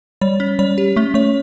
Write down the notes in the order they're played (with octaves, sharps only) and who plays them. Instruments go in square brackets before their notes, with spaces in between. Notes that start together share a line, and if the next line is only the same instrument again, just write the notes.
[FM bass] G3 [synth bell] C#5
[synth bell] C#4
[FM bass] G3 [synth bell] C#5
[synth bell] G4
[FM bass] A3 [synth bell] C#4
[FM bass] A3 [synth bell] C#5